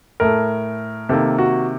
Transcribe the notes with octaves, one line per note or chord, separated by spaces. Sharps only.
A2 A3 A#4
C3 D#3 A#3 A4
F#4